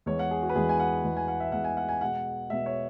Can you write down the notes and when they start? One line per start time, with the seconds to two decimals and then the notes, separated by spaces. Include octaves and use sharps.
0.06 E2 E3 G#3 C#5
0.19 F#5
0.31 G#4
0.42 F#4
0.49 B4
0.55 E2 E3 G#3 G#4
0.69 G#5
0.79 F#5
1.04 E2 E3 G#3
1.16 G#5
1.28 F#5
1.40 E5
1.52 E2 E3 G#3 F#5
1.64 G#5
1.77 F#5
1.89 G#5
2.01 B2 G#3 F#5
2.50 B2 G#3 E5
2.66 C#5